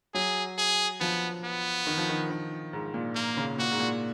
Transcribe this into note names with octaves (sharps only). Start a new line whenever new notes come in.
F#3 G#4
G#4
F3 B3
B3
D#3
F3
D#3
D#3
G#2
A#2
A#3
C#3
A#2 F#4
G#2
A#2